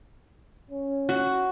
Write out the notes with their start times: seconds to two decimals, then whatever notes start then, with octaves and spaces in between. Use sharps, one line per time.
0.71 C#4
1.09 F#4